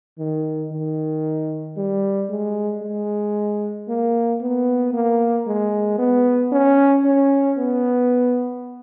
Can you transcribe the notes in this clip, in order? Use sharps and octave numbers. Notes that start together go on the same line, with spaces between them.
D#3
D#3
G3
G#3
G#3
A#3
B3
A#3
G#3
B3
C#4
C#4
B3